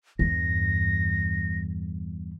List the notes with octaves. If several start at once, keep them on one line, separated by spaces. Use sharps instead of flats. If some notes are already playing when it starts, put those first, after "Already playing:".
E2 G2 A#6